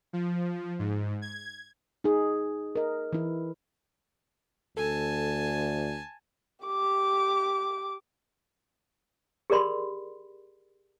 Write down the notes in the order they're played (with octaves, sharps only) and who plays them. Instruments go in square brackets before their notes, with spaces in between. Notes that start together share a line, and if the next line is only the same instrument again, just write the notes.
[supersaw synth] F3
G#2
G#6
[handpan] D#4 G#4
A#4 D#5
E3 E4
[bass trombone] D2 [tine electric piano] A4 [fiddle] G#5 A5
[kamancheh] G4 D6
[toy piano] G4 G#4 A#4 D5 B5 C6